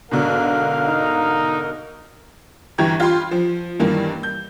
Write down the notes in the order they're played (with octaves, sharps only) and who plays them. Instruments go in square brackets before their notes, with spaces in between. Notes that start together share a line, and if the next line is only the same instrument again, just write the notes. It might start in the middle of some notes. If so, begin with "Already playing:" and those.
[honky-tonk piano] G#2 B2 D3 [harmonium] A#4 [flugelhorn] F5
[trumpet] D#4
[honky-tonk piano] G1 E3 G4 A#5 C#6 G#6
F4 G4 B5 C6
F3
G2 D#3 E3 A#3
G6